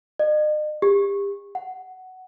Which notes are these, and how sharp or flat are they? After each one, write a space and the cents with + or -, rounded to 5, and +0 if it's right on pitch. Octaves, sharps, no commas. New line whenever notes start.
D#5 -40
G4 +35
F#5 +10